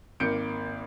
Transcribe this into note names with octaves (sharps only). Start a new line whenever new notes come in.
G#1 A#3 G6 C#7 D7